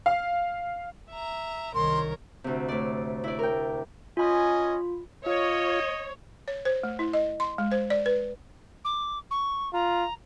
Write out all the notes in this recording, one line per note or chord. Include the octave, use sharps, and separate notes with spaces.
F5
E5 A#5
C2 D#3 A#4 C#5 C6
D2 C3
A2 D5
E4 D5
A#4 G5
C#4 F4 D#5 G#5 B5
F4 C#5 D#5
C#5
C5
A3
E4
D#5
C6
G#3
C5
D5
B4
D6
C#6
F4 A#5